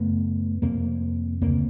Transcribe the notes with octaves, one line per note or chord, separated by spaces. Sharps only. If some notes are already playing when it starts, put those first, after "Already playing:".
Already playing: F#2 C#3 A3 B3
F2 C3 A#3 C4
D2 C#3 A#3 C4